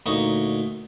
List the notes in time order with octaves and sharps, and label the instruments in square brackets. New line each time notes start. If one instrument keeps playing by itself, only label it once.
[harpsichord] D2 A#2 D#4 D#5 C#6